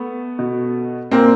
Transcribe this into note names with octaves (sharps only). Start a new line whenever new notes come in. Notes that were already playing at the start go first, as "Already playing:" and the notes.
Already playing: A3 B3
B2
A#2 A#3 C4